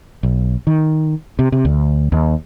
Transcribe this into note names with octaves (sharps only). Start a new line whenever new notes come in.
B1
D#3
C3
C3
D2
D#2